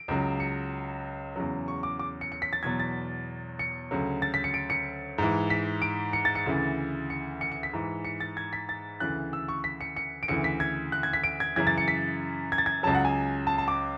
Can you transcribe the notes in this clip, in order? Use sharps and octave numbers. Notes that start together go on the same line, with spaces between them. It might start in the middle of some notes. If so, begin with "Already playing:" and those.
Already playing: D7
C#2 C#3 F#3
C#7
E2 C#3 F#3
C#6
D6
D6
C#7
C#7
B6
A6
E2 B2 F#3 G#6
A6
C#7
D2 C#3 F#3
A6
B6
C#7
D7
C#7
G#2 E3
B6
D7
C#7
A6
C#7
D2 C#3 E3
C#7
C#7
C#7
B6
G#2 E3
C#7
A6
G#6
B6
A6
D2 C#3 E3 F#6
E6
C#6
B6
C#7
C#7
D7
D2 C#3 E3 C#7
B6
G#6
F#6
G#6
B6
D7
G#6
F#2 C#3 E3 G#6
A6
C#7
B6
G#6
A6
G#6
C#2 C#3 F#3 A5
F#5
G#5
A5
A5
D6